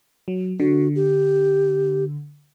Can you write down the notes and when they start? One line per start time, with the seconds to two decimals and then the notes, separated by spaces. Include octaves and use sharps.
0.28 F#3
0.60 D3 F#4
0.95 G4